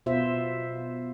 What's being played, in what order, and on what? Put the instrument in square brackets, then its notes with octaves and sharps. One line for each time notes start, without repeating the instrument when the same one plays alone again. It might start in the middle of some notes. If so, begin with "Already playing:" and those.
[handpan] B2 F4 C5 E5